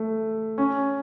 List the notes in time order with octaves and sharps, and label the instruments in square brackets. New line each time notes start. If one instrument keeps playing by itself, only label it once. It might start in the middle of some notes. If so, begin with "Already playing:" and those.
Already playing: [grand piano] A3
C#4